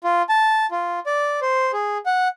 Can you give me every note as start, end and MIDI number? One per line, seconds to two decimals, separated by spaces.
0.04 0.22 65
0.29 0.66 81
0.71 0.99 65
1.06 1.40 74
1.42 1.72 72
1.73 1.98 68
2.06 2.28 78